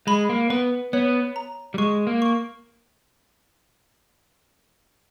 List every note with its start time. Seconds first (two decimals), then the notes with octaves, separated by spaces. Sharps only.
0.07 G#3 B5
0.29 A#3
0.50 B3 B4
0.93 B3 C#5
1.36 A#5
1.74 G3
1.78 G#3 C#6
2.07 A#3
2.22 C#6